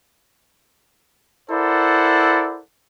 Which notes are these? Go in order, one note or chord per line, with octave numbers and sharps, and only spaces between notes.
E4 A4 A#4 C5 D5 F#5